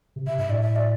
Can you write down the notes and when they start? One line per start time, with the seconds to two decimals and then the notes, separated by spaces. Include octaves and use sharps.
0.16 C3
0.27 C3 E5
0.38 G2 E5
0.49 A2 D5
0.61 E5
0.76 D5